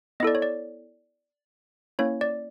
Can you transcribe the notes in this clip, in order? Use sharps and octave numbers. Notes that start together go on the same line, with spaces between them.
B3 E4 A4 D5 D#5
C#5
D5
A#3 C#4 E4 C#5
D5